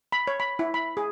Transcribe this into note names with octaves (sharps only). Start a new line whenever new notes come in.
B5
C#5
B5
E4
B5
G#4